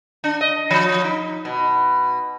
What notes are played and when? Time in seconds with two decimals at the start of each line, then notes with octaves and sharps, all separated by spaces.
0.24 D4
0.41 D#5
0.71 F3
1.04 D#4
1.45 B2